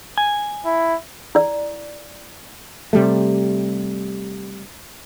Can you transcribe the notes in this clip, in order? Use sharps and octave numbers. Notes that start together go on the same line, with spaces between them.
G#5
E4
E4 D5
C3 G3 A3